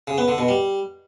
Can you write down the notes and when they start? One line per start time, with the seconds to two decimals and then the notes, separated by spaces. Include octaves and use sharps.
0.07 C#3
0.18 B3
0.28 D3
0.38 B2
0.48 G3